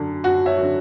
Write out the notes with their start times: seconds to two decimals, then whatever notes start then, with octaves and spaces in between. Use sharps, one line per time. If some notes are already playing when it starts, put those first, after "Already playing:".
Already playing: F#2 D3 F#3
0.24 F#2 F#4
0.46 C#5 E5
0.57 D3 F#3